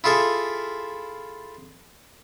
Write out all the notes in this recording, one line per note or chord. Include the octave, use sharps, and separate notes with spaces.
E4 F4 G#4 A4 E5